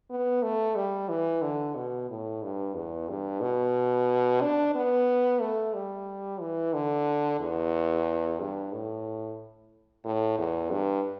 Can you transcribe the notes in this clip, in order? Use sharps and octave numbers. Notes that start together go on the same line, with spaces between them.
B3
A3
G3
E3
D3
B2
A2
G2
E2
G2
B2
D4
B3
A3
G3
E3
D3
E2
G2
A2
A2
E2
G2